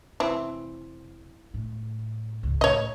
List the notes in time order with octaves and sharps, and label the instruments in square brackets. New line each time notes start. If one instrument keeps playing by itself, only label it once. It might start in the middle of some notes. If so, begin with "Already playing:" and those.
[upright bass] F1 [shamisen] E3 C4
[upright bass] A2
C#2 G#2
[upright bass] A2 [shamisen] C#5 D#5